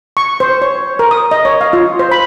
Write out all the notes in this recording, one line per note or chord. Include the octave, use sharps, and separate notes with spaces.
C#6
C5
C#5
A#4
D#6
D#5
C#5
F5
F4
C5
B5